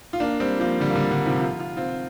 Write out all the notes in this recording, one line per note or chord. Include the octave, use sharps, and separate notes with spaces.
F4
A#3 D4
G3 C4
F3 A#3
D3 G3
A#3
D3 G3
D3
C3 F3
F4
F4
C4 F4